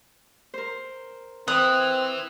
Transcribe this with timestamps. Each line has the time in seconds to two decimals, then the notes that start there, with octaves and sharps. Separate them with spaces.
0.54 A#4 C5
1.48 E3 C4 D#6 F#6